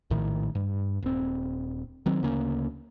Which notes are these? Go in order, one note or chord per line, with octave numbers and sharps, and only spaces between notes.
A#1 A2 D#3
G2
D#1 C4
D#3 F#3 C4
D2 C#3 A#3 C#4